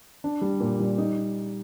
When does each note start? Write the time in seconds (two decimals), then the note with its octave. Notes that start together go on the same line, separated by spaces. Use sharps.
0.24 D4
0.42 G3
0.60 A#2
0.80 G3
0.98 D#4